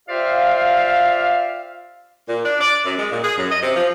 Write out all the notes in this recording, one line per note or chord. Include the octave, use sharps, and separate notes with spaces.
F4 G4 C5 D5 E5 F5
A#2
D4
D5
F#2
G#3
A#2
G#4
F#2
D#5
C3
F3